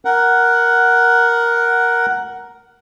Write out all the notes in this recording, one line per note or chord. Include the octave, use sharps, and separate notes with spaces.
A#4 F#5